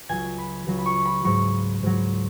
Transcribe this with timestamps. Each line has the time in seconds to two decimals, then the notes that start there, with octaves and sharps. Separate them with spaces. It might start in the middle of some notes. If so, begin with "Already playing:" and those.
0.09 C#2 C#3 F#3 G#5
0.38 B5
0.67 C#2 C#3 F#3
0.78 B5
0.86 C#6
1.05 B5
1.24 G#2 F#3 C#6
1.83 G#2 F#3